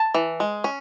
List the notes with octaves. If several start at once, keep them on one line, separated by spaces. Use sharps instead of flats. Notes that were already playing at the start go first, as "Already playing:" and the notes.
Already playing: A5
E3
G#3
C#4